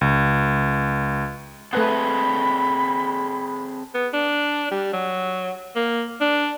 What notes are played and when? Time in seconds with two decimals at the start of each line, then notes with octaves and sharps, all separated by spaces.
0.01 C#2
1.73 A3 C4 G#4 A4 B4 F#5 B5
3.94 B3
4.13 D4
4.71 G3
4.93 F#3
5.76 A#3
6.21 D4